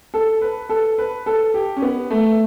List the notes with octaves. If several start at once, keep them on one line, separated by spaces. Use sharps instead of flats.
A4
B4
A4
B4
A4
G4
C#4
B3
A3